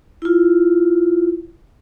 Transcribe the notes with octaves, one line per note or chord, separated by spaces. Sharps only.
E4 F4